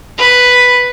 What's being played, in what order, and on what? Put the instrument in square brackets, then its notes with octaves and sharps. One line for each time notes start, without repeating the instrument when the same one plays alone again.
[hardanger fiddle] B4